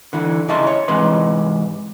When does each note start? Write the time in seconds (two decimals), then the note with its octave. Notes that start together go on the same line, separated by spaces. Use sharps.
0.13 D3 E3 E4
0.48 C#3 E4 D#5 E5 A5 C6
0.67 C#5
0.88 G#2 C3 E3 B4 D#5 C6